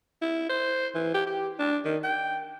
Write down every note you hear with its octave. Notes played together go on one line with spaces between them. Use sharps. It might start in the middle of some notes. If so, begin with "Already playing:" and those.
E4
C5
E3
G4
G4
D4
D#3
G5